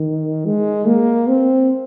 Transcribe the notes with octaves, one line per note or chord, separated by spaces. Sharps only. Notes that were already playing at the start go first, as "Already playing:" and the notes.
Already playing: D#3
G#3
A#3
C4